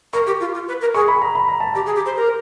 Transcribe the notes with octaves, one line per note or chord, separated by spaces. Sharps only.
A#4 C#6
G4
F4
F4
B4
A#4
G#4 C#6
B5
A#5
B5
A#5
A5
G4 A#5
G#4
G4
C5
A#4